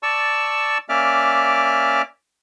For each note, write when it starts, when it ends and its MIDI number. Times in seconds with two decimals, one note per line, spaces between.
0.03 0.78 74
0.03 0.78 81
0.03 0.78 85
0.03 0.78 88
0.89 2.02 58
0.89 2.02 61
0.89 2.02 74
0.89 2.02 76
0.89 2.02 86
0.89 2.02 89